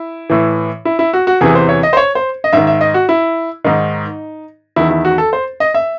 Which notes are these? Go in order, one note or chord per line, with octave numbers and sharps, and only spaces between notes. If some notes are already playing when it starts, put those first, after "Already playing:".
Already playing: E4
A2 E3
E4
E4
F#4
F#4
E2 C3 E3 G#4
C5
C#5
D#5
C5
C#5
C5
D#5
G#2 D#3 E5
E5
D#5
F#4
E4
G#2 D#3 D#4
E2 D#3 E4
E4
F#4
A4
C5
D#5
E5